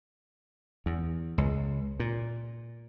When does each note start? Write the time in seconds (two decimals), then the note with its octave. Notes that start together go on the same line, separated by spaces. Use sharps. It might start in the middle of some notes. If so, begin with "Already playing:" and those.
0.86 E2
1.38 C#2
2.00 A#2